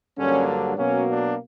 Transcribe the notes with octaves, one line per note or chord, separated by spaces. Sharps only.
G2 D3 F#3 A#3 C#4
D4
B2 F#3 A#3 C#4
D4